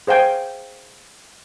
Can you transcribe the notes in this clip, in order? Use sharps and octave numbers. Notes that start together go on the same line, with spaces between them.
G#4 C5 F5 G5 G#5